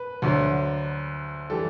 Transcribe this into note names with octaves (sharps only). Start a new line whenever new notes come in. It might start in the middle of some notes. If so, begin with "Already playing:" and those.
Already playing: B4
D2 D3 F#3
E3 G3 A4